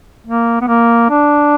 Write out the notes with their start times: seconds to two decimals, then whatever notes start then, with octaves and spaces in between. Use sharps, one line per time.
0.26 A#3
0.61 B3
0.68 A#3
1.10 D4